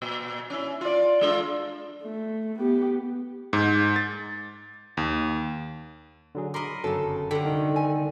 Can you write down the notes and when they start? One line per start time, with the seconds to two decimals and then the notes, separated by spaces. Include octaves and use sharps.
0.02 A#2
0.50 C#4 E4
0.81 F4 D5
1.21 G#3 D4 F4
2.03 A3
2.59 B3 G4
3.53 G#2
3.96 A6
4.97 D#2
6.35 D3 F#3 G#4
6.54 A#4 D#5 B5 C6 D6
6.84 G1 F#2 C#3 F#3 A4
7.31 G2 D3 G4
7.45 C2 D#3
7.76 G#5